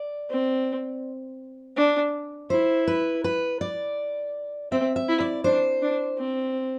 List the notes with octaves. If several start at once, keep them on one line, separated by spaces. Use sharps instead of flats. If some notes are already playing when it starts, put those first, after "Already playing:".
Already playing: D5
C4
D4
E4 C5
B4
B4
D5
C4 E5
E5
E4
D5
D4 C5
D4
C4